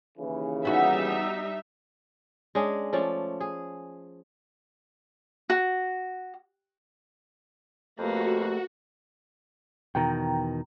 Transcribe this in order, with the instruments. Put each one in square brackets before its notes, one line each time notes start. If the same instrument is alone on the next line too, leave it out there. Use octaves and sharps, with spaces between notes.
[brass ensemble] D#2 C#3 E3
[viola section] G3 D#4 E5 [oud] B3 F#4
[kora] G#3 C#4 D4 G#4
F3 A3 C#4 D5
G#4
[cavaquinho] F#4
[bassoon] F2 [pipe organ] A3 G4 A4 [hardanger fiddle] A#3 B4 [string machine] F#4
[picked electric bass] E2 B2 D#3 [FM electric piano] G5 A#5